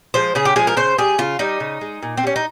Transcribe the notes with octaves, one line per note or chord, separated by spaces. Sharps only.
F3 G#3 C5
C#3 G#4
G4
F3 G#3 G#4
A#4
C#3 C5
G3 G#4
C#3 F4
G3 D#4
C#3
G#3
A#2
C4
G3 C#4
D#4